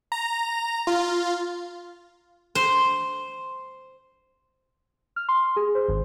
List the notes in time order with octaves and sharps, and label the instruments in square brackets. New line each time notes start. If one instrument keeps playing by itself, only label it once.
[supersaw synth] A#5
F4
[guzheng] C5
[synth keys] F6
C6
G#4
C5
G#1